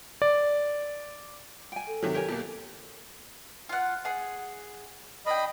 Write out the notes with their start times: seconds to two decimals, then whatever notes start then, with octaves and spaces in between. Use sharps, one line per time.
0.22 D5
1.72 G5 G#5
1.87 A4
2.03 C3 D#3 F#3
2.14 G4 A#4 C#5 G#5
2.28 B2 A#3 G4
3.69 F4 F#5
4.05 G#4 F#5
5.26 D4 D#5 G5 B5